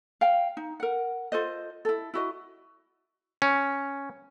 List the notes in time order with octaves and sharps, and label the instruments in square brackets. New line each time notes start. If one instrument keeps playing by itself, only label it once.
[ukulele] F5 G5
D#4
A#4 F#5
F4 A4 C5 D#5
E4 A4
E4 F#4 D#5
[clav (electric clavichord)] C#4